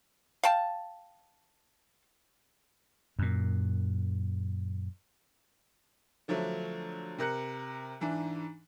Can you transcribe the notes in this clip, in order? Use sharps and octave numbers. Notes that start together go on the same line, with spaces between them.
F5 G5 A5
F#2 A#2
D3 F3 F#3 A3 D4
C3 A#4 F#6 C#7
G#2 E3 D4